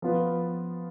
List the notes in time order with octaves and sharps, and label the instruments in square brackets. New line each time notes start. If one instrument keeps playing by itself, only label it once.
[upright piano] F3 B3 F4 B4